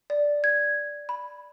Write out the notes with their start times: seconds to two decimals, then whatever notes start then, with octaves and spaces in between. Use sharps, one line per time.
0.10 D5
0.44 G#6
1.09 B5